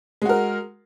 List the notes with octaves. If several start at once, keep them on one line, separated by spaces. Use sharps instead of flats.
G#3 F#4 A#4